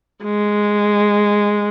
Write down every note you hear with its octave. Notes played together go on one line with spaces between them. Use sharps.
G#3